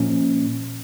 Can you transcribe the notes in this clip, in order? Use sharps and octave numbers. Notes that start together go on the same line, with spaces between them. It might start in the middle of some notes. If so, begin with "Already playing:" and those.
Already playing: A#2 F3 A#3 C#4